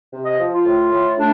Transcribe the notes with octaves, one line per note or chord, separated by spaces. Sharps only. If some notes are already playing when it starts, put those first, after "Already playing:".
C3
D#5
F3
F4
A2
A2
A3 D4